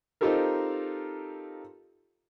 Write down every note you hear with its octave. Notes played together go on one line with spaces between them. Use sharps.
C4 D#4 F4 G4 A4 A#4